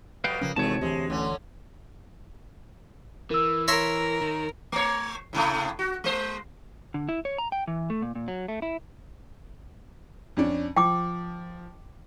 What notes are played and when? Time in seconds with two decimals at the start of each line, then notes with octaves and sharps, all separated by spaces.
0.24 F2 B2 G3 B4 F5 G5
0.41 C#3 F3 A#3 C#4
0.56 G#1 E2 C3 G#3 A3 C#5 A5
0.81 D2 C3 E3 G#3
1.10 A1 D3 C#4
3.31 E3 A#4 E6
3.68 A#4 C#5 E5 C6 A#6
4.21 D#3
4.72 A3 C#5
5.33 A2 C3 A3
5.79 F#4
6.04 G#3 C5
6.94 D3
7.09 E4
7.25 C#5
7.38 A#5
7.52 G5
7.68 E3
7.90 A3
8.02 A#2
8.15 A#2
8.28 F#3
8.48 A3
8.62 E4
10.37 F2 C#4 D4
10.77 F3 G5 D6